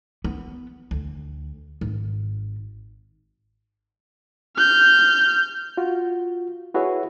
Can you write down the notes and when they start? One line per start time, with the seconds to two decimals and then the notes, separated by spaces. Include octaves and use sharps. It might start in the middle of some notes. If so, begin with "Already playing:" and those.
0.24 B3
0.91 D2
1.81 G#1
4.57 F6 G6
5.77 F4 F#4
6.74 E4 F#4 G#4 B4 C#5 E5